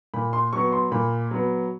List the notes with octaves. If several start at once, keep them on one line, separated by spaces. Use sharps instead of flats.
A#2 B5
C6
F#3 B3 C#6
C6
A#2 B5
F#3 B3